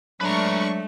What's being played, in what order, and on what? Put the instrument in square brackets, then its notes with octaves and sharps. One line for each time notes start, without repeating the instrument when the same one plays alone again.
[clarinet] F#3 [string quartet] G#3 A3 [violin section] D4 C#6 [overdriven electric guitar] B4 A#5